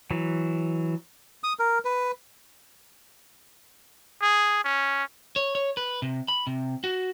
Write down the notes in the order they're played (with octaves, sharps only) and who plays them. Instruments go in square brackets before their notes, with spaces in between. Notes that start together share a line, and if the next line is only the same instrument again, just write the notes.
[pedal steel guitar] E3 F#3
[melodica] D#6
A#4
B4
[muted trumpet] G#4
C#4
[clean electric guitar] C#5
C#5
B4
C3
B5
C3
F#4